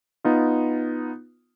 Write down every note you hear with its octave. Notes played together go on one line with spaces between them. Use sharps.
B3 D#4 F4